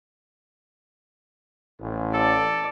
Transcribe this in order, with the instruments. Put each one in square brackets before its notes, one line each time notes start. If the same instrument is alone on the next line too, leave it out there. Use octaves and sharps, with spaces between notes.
[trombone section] A1
[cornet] A4 [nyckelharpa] D5